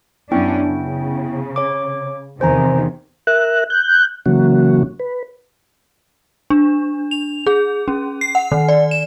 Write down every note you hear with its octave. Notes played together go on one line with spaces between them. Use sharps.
F#2 B3 C#4 D4 E4 G5
C#3
C#5 D6
E2 C3 D#3 C5 G#5 A#5
A#4 E5 F#6
F#6 G6
C#3 E3 F#3 A#3 C#4 F#4
B4
D4
F7
G#4
C#4
C7
F#5
D#3
D5
E7